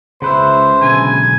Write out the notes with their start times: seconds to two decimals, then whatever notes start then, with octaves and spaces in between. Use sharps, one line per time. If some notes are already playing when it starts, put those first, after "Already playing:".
0.22 C#2 C#3 B4 C5 E5
0.81 B1 D3 G#5 A#5